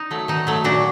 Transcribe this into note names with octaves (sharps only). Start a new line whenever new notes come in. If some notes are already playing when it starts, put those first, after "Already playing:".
Already playing: D#4
F#3 A3
D#3 D#4
F#3 A3
A#2 D4 F#4